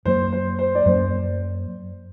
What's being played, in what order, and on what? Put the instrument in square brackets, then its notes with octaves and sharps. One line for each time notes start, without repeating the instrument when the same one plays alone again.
[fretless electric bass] F#2 F#3 A#3 [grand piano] C5
[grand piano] C5
C5
D5
[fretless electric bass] F#2 F#3 A#3 [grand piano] C5